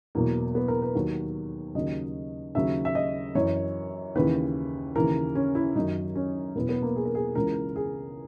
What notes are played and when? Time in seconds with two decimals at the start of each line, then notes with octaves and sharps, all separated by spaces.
0.15 E2 B2 F#3 A#3
0.55 B3
0.68 A#4
0.82 B4
0.95 D#2 D#3 F#3
1.75 D#2 C#3 F#3 D#5
2.55 D#2 C#3 F#3 E5
2.85 E5
2.95 D#5
3.35 F#2 E3 C#5
4.15 D#2 C#3 E3 B4
4.96 D#2 C#3 E3 A#4
5.35 C#4
5.55 E4
5.75 F#2 D#3 F#3 D#4
6.15 C#4
6.56 E2 B2 F#3 B3
6.69 B3
6.82 A#3
6.96 G#4
7.05 A#4
7.15 G#4
7.35 C#2 C#3 E3 A#4
7.76 G#4